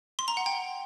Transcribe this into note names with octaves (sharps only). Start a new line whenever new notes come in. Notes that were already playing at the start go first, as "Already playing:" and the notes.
C6
A#5
F#5
G5